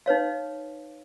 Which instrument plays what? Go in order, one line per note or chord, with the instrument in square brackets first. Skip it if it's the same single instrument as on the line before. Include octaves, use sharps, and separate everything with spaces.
[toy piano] D#4 B4 C#5 F5